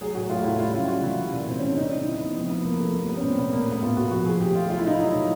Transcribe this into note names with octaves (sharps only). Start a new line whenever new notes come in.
F#3 G#4
A2 F#4
A2 F4
F#3 E4
G3 F4
C#3 F4
C#3 F#4
E3 E4
G3
A#2
A#2 C4
G3 C#4
D4
C#3 D#4
C#3 D#4
C#3 E4
C#3 B3
F3 C4
F3 B3
F3 A#3
F3 A3
G3 A#3
G3 B3
C#4
A#2 C4
A#2 B3
A2 A#3
A2 B3
A2 F4
A2 F#4
F3 F#4
F3 G#4
F3 G4
A2 F4
F#3 F4
E4
F#3 D#4
E4
F#3
A#2